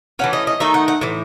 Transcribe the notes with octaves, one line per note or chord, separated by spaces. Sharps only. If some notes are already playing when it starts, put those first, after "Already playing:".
E3 A3 C#4 F#5
D#5
D#5
D#3 A3 D#4 E5
F#5
F#5
A2 E3